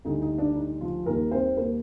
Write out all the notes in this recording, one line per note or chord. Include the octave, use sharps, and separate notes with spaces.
D2 D3 G3 D#4
D#4
D4
D#4
F3 F4
D#2 D#3 G3 A#3 A#4
C4 C5
A#3 A#4